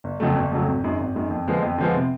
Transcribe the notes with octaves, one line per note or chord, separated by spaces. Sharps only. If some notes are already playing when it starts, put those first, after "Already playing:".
G1
F2 C#3 F#3 A3
G1
F2 C#3 F#3 A3
G#1
F#2 D#3 G#3
G#1
F#2 D#3 G#3
F2
D3 F3 G#3 B3
F2
D3 F3 G#3 B3
C3